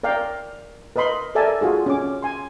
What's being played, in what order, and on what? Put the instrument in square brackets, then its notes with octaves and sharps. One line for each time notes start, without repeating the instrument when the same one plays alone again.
[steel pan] A#4 D5 F5 G5
A#4 B4 D#5 B5 C6
A4 A#4 D5 E5 G#5 A5
F4 F#4 G#4
C#4 D6
G#5 C6